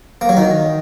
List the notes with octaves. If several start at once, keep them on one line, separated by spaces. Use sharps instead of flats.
A#3
F#3
D#3